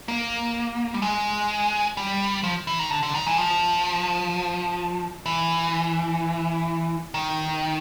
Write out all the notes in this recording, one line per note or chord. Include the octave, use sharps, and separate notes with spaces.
A#3
G3
G#3
G3
F3
E3
D#3
D3
D3
D#3
E3
F3
E3
D#3